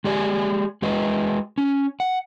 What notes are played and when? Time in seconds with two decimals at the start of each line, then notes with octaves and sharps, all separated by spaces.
0.04 G#3 G4 G#4 D5 G5 G#5
0.82 G#3 F#4 G#4 B4 D#5
1.58 C#4
2.00 F#5